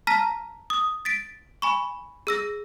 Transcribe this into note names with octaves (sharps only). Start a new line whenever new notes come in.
A5 A#5 F6 A#6 B6
D#6
A6 B6 D7
G#5 B5 C#6
G#4 E6 A#6